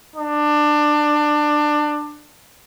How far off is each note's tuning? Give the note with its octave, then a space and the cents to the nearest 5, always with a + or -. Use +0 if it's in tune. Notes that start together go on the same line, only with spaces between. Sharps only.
D4 +20